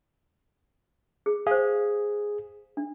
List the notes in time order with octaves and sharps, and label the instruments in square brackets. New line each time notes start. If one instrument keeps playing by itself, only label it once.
[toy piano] G#4
[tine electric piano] G#4 [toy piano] C5 F5
[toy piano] D4